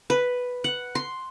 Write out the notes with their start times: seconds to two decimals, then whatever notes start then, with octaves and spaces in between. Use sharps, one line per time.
0.10 B4
0.64 F#5
0.95 C6